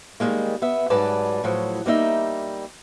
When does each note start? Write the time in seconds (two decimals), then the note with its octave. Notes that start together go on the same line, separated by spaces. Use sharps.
0.20 D#3 F3 G3 G#3 A#3
0.62 B3 E5
0.90 G#2 F#3 G3 B4 D5 A5
1.44 A2 F3 F#3
1.86 G3 A#3 D#4 E5